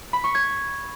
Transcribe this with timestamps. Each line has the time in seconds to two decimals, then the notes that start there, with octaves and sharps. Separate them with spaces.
0.13 B5
0.24 C#6
0.35 G#6